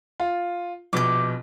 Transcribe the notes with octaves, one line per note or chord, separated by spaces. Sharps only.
F4
A#1 B2 D6 G6